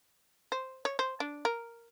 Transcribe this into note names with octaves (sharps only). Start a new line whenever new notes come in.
C5
C#5
C5
D4
A#4